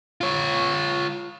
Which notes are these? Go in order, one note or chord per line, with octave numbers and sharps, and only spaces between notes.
F4 C#5